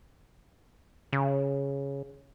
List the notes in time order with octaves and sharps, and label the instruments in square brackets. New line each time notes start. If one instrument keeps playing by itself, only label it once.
[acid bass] C#3